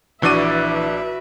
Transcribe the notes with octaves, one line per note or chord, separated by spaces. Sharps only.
A#1 E3 D4 F#4 B4 D5 E5 D#7